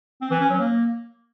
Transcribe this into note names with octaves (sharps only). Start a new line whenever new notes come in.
C4
E3
C#4
F#3
A#3